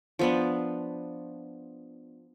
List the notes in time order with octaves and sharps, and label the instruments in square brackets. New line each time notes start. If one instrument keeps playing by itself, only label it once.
[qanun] F3 B3 D4